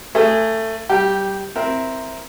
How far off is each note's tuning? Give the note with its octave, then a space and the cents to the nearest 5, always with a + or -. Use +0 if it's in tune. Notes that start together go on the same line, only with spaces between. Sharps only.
A3 +20 G#4 +0
G3 -25 G4 +0
C4 +0 E4 +0 A#4 +0